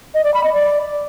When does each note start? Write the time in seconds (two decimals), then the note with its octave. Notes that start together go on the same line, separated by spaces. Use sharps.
0.14 D#5
0.24 D5
0.34 B5
0.44 D#5
0.54 D5